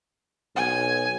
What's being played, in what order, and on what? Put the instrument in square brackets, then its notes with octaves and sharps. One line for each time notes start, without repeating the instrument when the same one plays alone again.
[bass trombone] B1 [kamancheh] G#5